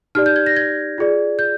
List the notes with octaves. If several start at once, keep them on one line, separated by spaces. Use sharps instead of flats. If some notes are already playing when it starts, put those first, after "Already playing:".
D#4 G4 D5 F6
G6
G#6
A#6
G#6
F4 G#4 D5
G6